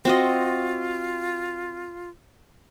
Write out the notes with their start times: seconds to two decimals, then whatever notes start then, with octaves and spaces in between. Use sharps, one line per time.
0.05 C4 F4 F#4 D#5